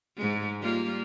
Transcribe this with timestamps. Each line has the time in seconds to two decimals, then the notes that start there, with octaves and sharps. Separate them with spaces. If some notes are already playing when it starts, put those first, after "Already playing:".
0.17 G#2 G#3
0.60 G3 A#3 F4